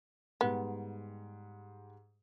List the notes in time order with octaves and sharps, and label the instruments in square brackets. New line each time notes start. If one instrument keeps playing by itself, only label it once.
[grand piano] G#2 G3 [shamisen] B3